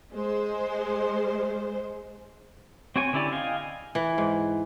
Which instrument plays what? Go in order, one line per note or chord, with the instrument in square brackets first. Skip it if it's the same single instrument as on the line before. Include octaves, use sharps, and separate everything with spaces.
[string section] G#3 C5
[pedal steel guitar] C4 F#4 C#5 G5 G#5
D3 C#4 E4 G4 D5
D#5 F5 G5 G#5
[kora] E3
G#2